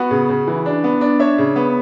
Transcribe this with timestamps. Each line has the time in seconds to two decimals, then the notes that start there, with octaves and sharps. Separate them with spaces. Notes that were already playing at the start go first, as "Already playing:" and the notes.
Already playing: B3 F#4
0.11 C#3
0.29 C#3
0.47 E3
0.66 D4
0.84 B3
1.01 D4
1.19 D4 C#5 E5
1.38 C#3
1.56 B3